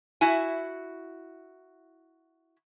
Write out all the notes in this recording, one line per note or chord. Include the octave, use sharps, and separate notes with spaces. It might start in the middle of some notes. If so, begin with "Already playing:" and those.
E4 F#4 G#5